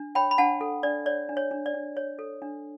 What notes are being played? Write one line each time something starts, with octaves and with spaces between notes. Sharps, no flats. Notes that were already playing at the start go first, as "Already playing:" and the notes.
Already playing: D4
C#5 G5 B5
B5
D4 F#5 A5
A4
D4 D5
C#5 D5
D4
C#5
D4
D5
D4
C#5
A4
D4